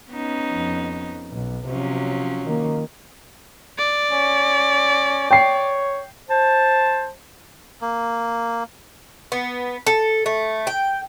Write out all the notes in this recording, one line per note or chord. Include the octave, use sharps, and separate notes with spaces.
B3 C#4 D#4
F2
B1
C3 F3 F#3 C#4
D#3 A#3
D5
C#4
C#5 G5 C7
C5 A5
A#3
B3
A4
A3
G5